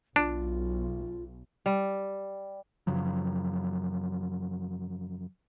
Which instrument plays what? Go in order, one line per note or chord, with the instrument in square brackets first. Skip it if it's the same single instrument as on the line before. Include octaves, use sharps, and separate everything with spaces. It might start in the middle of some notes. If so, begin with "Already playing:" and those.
[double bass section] B1 [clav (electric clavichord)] D4 [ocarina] F4
[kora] G3
[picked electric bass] F#2 C#3 F3 F#3